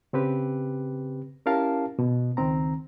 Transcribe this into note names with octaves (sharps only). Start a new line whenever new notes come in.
C#3 C4 G4 B4
C#4 E4 G4 A#4 F5 A5
B2
C#2 D#3 C4 A#5